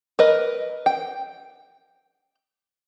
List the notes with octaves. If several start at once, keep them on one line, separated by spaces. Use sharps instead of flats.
A#4 B4 D#5
G5